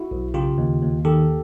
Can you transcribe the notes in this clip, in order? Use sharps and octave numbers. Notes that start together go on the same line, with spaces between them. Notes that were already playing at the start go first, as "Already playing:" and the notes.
Already playing: E4 F#4
B1
C#3 F4 G4
D#2
D#2
D#3 G4 A4